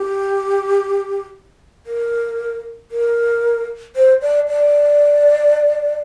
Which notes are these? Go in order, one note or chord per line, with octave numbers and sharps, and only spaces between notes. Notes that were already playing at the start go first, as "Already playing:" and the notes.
Already playing: G4
A#4
A#4
C5
D5
D5